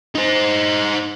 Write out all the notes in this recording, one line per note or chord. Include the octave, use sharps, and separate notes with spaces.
D#4 C5